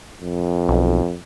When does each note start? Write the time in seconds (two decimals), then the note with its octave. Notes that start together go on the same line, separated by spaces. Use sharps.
0.22 F2
0.68 B1